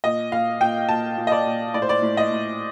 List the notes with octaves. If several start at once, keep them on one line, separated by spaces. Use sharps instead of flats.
A#2 D#5
A#2 F5
A#2 G5
A#2 A5
A#2
D#5
D5
A#2
A2 D5
C5
D5
A2
D#5
A2